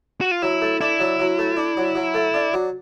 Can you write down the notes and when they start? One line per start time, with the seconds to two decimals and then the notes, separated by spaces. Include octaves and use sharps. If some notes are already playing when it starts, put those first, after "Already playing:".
0.21 F#4
0.31 F4
0.42 F#3 E4
0.62 A3
0.81 D4 E4
1.00 F#3
1.19 F#3
1.39 A3
1.57 D4
1.77 F#3
1.95 F#3
2.14 A3
2.34 D4
2.53 F#3